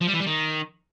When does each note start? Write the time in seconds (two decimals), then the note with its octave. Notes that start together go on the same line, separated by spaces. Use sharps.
0.02 F3
0.08 G3
0.14 E3
0.20 G3
0.27 D#3